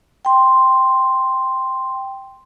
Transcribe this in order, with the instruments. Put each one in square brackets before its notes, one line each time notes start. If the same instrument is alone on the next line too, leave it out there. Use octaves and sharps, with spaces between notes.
[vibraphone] G5 C6